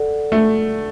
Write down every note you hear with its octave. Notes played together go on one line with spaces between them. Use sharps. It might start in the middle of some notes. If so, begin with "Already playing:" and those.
Already playing: A4 D5 F#5
A3